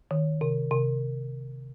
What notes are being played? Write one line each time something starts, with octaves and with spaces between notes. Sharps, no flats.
D#3
C3
C3